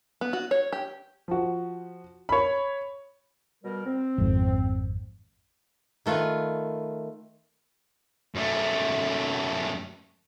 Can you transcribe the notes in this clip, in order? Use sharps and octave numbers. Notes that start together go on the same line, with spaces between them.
B3
F#4
C#5
G4
F3 F#4
C#5 B5
B2 G3 A#4
C4
G#1 F2
D#3 A3 F4 B4
F#2 A3